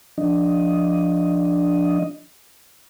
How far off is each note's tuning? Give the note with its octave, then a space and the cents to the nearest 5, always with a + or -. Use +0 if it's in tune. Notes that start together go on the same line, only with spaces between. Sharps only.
F3 +0 D4 +0 D#5 +5